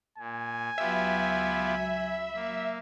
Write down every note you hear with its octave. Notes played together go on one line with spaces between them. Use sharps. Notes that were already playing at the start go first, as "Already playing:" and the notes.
A#2 G#5
C#2 F#3 B3 F4 G4 E5 B5
A#3